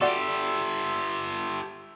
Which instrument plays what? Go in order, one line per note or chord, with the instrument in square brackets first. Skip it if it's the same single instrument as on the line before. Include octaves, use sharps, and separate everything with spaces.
[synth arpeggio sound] F#4 D5 F#5 [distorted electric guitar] G4 A4 [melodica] E5 C6